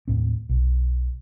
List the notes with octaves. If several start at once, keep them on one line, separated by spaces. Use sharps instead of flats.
D#2 A2 C4
B1